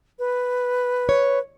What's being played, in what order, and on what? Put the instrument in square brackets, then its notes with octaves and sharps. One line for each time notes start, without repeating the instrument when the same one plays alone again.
[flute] B4
[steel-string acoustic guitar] C#5